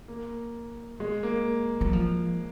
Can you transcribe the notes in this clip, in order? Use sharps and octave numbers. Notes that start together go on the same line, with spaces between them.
A#3
G#3
A#3
F#3
F3